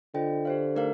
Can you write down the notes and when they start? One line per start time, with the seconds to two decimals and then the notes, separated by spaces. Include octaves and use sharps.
0.14 D3 F4 C5 D#5 G5
0.45 G4 C5 F5
0.76 A3 D#4 A#4 F5